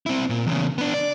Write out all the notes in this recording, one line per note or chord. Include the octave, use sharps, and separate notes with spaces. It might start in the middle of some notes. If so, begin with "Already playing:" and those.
C4 E4
A#2
E2 C#3
B3 D4
D5